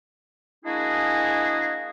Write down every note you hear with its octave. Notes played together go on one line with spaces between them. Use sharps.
G#3 A#3 D4 E4 F#4 G#4